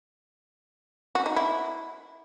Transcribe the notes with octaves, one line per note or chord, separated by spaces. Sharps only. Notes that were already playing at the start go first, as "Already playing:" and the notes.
F#4
D#4
E4